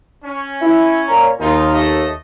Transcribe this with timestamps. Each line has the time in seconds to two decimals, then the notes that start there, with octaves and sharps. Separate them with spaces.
0.24 C#4
0.61 E4
1.08 A#2 C#5 A#5
1.40 D#2 D#4 F4
1.73 A3 A4 D#5